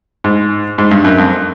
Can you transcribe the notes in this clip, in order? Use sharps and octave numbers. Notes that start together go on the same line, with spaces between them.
G#2
G#2
G2
F#2
F2